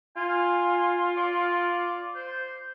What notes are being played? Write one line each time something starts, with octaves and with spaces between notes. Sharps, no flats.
F4 G#5
D5
C5